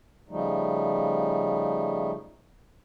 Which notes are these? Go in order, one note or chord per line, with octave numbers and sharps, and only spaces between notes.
C#3 F3 G3 A3 D#4